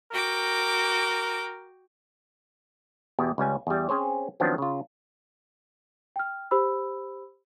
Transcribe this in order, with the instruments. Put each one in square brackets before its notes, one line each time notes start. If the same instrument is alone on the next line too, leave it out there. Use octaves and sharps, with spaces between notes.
[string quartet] F#4 G5 D6 [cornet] A#4
[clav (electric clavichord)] E2 B2 G4
C#2 G3 C#4 G#5
E2 G3
C4 C#4 G#4 C5 C#5
D#3 F3 F#3 B3 C4 D4
C#3 F4
[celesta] G5 F6
G4 C5 B5 E6